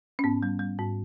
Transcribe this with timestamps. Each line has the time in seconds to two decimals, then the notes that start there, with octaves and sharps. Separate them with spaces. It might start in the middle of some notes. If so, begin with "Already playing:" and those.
0.19 C#4
0.24 G#2 B3
0.43 G3
0.59 G3
0.78 G#2